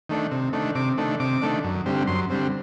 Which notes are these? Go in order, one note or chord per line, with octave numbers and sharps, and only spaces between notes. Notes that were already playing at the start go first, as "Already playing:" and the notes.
D#3 A3 D4
C3
D#3 A3 D4
C3 D6
D#3 A3 D4
C3 D6
D#3 A3 D4
F#2
D3 G3 C4
F#2 C6
D3 G3 C4